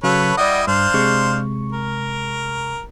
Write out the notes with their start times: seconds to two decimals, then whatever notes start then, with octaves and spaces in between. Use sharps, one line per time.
0.03 C#3 F#3 A4 B4 C#5 F5
0.37 G3 E4 D5 D#5 F#5
0.67 G2 D4 C5 F5
0.94 C3 G#3 C#6
1.72 A#4